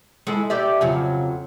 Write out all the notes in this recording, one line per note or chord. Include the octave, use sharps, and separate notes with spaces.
G#3 A3 E4
G4 D5 E5
F2 C#3 F#3